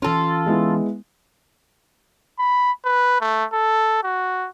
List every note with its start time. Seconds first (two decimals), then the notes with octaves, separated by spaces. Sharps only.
0.02 E3 C#4 F4 A4
0.46 G#3 B3 E4
2.39 B5
2.85 B4
3.21 A3
3.53 A4
4.03 F#4